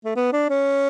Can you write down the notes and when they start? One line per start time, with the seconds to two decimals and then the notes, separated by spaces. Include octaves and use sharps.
0.05 A3
0.16 B3
0.33 D4
0.50 C#4